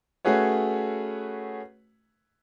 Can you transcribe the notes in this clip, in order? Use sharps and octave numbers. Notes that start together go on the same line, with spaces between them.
A3 C#4 F#4 G#4 B4 C#5